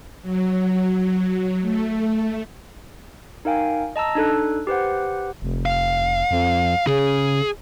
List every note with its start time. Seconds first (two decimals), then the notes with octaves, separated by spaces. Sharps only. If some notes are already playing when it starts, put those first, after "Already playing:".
0.22 F#3
1.61 A3
3.45 D#4 A#4 F5 G5 G#5
3.96 D#5 A5 A#5 E6
4.15 D4 D#4 A4 F#6
4.67 G4 B4 C5 F#5
5.42 F1
5.66 F5
6.31 F2
6.87 C#3 G#4